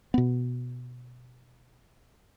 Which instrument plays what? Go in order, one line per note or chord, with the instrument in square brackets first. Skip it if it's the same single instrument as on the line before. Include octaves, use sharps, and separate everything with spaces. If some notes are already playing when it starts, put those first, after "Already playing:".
[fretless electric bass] B2 B3